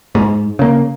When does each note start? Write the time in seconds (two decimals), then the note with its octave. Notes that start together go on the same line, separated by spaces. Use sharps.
0.15 G#2
0.59 C#3 A#3